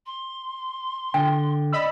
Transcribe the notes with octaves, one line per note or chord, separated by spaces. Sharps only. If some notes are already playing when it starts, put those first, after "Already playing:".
C6
D3 G5
D5 D#5 B5 E6